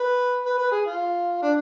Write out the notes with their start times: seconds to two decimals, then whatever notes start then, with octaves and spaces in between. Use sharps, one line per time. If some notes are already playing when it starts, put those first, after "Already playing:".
Already playing: B4
0.45 B4
0.58 B4
0.71 G#4
0.86 F4
1.42 D4